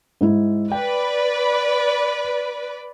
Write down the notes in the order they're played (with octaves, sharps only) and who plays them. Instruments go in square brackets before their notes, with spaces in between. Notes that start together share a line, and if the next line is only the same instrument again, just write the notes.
[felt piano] G#2 G#3 E4
[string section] B4 D5 [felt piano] G5